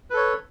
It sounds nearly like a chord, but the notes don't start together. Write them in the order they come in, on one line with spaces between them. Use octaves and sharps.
B4 A4 C#5